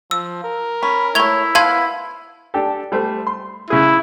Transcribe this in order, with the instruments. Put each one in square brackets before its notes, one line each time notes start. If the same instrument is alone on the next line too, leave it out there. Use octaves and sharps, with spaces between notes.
[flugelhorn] F3 [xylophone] E6
[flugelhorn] A#4
[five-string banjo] C#4 [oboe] B5
[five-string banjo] A3 C#5 [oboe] E4 [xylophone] G#6 F7 G7
[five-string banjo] B3 F5 [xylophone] A5 C6 G#6
[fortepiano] D4 G4 A4
G3 A3 C5
C6
[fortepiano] C#3 G#4 [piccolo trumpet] E4